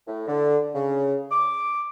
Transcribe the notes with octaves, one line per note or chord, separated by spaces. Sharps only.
A2
D3
C#3
D6